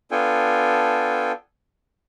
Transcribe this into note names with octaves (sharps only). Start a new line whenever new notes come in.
B3 D4 F4 A4 G5 G#5